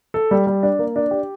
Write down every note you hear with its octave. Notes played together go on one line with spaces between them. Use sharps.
A4
G3
G3
D4
A#3
D4
G4